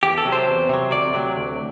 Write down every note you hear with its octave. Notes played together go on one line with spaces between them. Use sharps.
E2 G4
A4
C3 F#3
C5
E2
C3 F#3
D2 D5
C3 F#3
D2